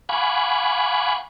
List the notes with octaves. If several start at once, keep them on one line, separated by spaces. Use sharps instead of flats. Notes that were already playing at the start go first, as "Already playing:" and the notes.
F5 F#5 G#5 B5 C#6 D6